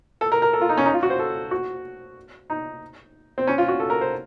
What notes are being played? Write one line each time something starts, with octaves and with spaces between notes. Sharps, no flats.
A4
A#4
A#4
A4
F4
D#4
C#4
D#4
F4
F#4
C5
A4
F#4
D#4
C4
C#4
F4
F#4
A4
A#4
C5